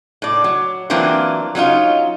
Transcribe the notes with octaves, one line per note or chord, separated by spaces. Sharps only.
A2 D5
F#3
E3 F#3 A#3 C4 D4 F4
F#3 C#4 D#4 F4